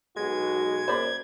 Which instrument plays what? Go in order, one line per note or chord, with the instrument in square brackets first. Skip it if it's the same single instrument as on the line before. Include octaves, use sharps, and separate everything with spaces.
[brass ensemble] B1 B2 F#4 [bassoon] G#3 [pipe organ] G#6
[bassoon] F#2 [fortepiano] C5 D5 B5